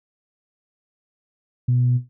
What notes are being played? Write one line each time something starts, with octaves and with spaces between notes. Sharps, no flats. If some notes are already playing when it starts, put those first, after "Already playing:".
B2